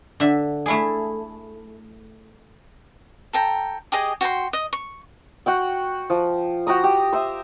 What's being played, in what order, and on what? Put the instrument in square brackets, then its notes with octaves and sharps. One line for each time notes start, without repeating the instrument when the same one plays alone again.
[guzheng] D3 E5
A3 E4 G#4
[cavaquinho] A4 G5 A#5
G4 G#4 D#5 G#5
F#4 G5 A5 C6
D#5
C#6
[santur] F#4 F#5 G5
F3
F#4 G5 A#5 D#6
G4
C5 E5 D#6